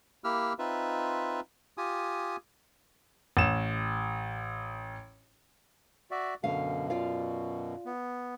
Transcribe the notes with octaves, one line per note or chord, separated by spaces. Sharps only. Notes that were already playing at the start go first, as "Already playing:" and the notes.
A#3 E4 G4 E6 F6
C4 D#4 F4 B4 E5
F4 G4 G#5 D#6
A1 E7
F#4 D5 E5
F#2 B2 D3 F5 G#5
F4 D5 F5
B3